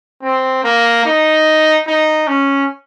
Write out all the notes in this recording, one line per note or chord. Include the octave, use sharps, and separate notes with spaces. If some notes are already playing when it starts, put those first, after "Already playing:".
C4
A#3
D#4
D#4
C#4